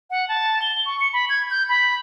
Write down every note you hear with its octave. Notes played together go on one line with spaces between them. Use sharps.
F#5
A5
G7
C#6
C#7
B5
G#6
G6
B5